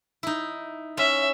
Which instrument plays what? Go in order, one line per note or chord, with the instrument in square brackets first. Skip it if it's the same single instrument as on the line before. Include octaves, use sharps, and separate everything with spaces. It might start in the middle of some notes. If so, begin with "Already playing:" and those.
[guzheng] D#4 E4
[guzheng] C#4 [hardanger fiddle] E5